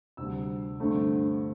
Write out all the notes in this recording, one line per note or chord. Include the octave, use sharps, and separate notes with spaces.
D2 C3 G3 E6
G2 D3 A3 C4